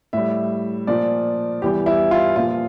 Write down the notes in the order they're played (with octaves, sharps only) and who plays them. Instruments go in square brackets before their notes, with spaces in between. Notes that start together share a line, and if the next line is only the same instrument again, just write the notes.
[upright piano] A2 G3 E5
A#2 F3 D5
E2 E3 G3 G4
E4
F4
A#2 F3 F4